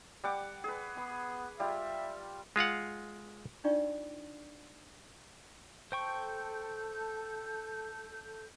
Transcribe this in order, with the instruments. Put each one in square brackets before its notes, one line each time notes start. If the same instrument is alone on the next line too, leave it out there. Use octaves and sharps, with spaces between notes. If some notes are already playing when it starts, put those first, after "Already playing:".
[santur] G3 F#5 D6
G#4 B4
[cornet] B3 [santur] B5
[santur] G3 F4 [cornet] E5
[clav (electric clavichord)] G#3 F4 F5 F#5
[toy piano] D4 D#4 F4 D5 G5 C#6
[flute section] A4 G6 [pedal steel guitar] C5 G5 C#6